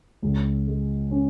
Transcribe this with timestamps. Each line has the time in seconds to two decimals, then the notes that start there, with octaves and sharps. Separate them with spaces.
0.22 C#2
0.67 G#3
1.11 C#4